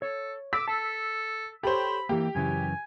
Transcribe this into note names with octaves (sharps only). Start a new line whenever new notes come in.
A4 C#5
D6 E6 B6
A4 A5
G4 A4 C5 C#5 B5
E3 A#3 G4
F#2 C#3 E3 G#5